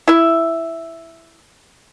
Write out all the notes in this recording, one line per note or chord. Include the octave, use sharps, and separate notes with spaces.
E4 E5